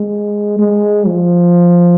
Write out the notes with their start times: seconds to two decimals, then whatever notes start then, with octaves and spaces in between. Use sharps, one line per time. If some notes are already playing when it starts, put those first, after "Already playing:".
Already playing: G#3
0.59 G#3
1.07 F3